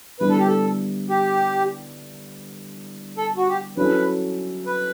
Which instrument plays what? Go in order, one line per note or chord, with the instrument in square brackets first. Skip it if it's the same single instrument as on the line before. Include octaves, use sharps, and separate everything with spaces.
[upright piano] D3 G3 B3 E4 [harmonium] B4
[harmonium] A4
G4
A4
G4
A4
F#4
G4
[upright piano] F#3 C#4 E4 A4 [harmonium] B4
[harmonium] B4